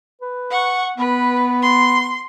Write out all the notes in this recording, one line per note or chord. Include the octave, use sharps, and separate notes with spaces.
B4
F#5 C#6
B3 B4
C6